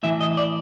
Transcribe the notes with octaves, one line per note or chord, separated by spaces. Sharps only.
A2 E3 E5
D#5
D5